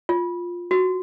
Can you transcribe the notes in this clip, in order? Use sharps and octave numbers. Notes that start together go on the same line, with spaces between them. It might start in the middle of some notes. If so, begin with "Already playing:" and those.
F4
F#4